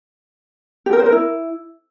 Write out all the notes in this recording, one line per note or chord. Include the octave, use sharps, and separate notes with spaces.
G4
A#4
C5
A#4
E4